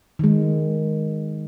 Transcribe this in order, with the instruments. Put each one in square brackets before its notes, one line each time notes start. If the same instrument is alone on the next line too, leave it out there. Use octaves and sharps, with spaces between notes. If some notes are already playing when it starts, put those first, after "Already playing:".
[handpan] D#3 G#3